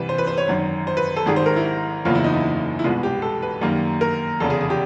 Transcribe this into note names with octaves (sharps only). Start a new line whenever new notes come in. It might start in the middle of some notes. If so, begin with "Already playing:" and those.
Already playing: C2 C3 E3 G3 B4
C5
B4
C5
C#5
G#1 F#2 D#3
C5
B4
A4
G#1 G#2 D#3 G3 G#4
C5
A#4
E4
F#1 E2 C#3 F3 A#3 F4
E4
D#4
E4
E4
C2 B2 G#3 B3 F4
G4
A4
B4
F#2 D#3 G3 A#3
A#4
F1 E2 C#3 A4
G#4
G#4
G4